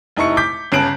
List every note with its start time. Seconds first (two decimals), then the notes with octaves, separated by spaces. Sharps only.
0.17 F1 D#4 E4 C#6 C#7
0.37 D6 G6 B6
0.72 G1 C#3 A5 F#6 D7 F#7